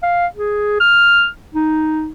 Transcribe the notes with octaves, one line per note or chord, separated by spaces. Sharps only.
F5
G#4
F6
D#4